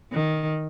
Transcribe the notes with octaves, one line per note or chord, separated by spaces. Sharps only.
D#3